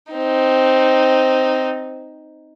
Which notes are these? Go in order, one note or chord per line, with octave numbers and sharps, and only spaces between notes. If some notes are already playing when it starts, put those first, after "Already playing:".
C4 D#4